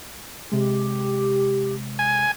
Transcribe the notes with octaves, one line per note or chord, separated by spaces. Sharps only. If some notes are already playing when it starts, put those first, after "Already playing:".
C3 G#3 G4
G#5